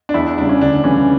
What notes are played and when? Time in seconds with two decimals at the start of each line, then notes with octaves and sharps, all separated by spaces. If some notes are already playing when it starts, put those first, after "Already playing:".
0.09 D4
0.14 E2 E4
0.26 D4
0.37 C#3 G3 D4
0.49 C#4
0.61 D2 D4
0.84 C#3 E3 G3 C#4